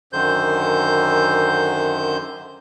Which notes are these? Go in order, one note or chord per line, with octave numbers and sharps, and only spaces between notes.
F#2 D3 D#3 C5 G6